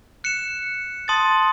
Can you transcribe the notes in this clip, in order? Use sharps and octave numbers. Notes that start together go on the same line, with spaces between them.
F#6 C#7 E7
A5 C6 D#6 A6